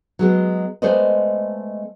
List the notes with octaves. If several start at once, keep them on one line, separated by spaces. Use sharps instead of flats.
F#3 G#3 B3
G#3 A3 B3 C5 D5 D#5